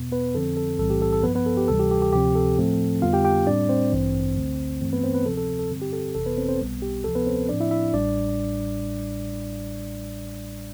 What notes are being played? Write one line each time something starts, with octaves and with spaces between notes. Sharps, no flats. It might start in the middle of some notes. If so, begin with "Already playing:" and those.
Already playing: E2 B2 B3
B3 B4
F2 D3 F3 C4 A4
A4
B1 A2 E3 G3 C4 A4
G4
A4
A4
G2 F3 B3 B4
B3 B4
A4
G4
D2 C3 E3 G3 A4
G4
G4
G4
D2 C3 F3 C4 G4
A4
A2 F3 A3 C4
F2 D3 G3 B3 F4 F5
G4 G5
G4 G5
A2 G3 C4 D4 D5
C4 C5
A1 G2 E3
D2 D3 A3
G2 E3 A3 C4
B3 B4
C4 C5
B3 B4
D2 C3 F3 C4 A4
A4
A4
G2 D3 G3 C4
G4
A4
G1 F2 C3 E3 A4
B3 B4
C4 C5
C4 C5
B1 B2 G3 B3
G4
D2 C3 F3 A4
B3 B4
C4 C5
A2 F3 C4 D4 D5
E4 E5
E4 E5
A1 A2 G3 D4 D5